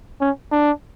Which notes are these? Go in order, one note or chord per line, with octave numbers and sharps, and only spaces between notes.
C#4
D4